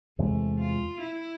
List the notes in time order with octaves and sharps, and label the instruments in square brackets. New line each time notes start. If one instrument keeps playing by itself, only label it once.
[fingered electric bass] E2 C3 E3 G#3 [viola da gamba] A3
[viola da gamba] F4
E4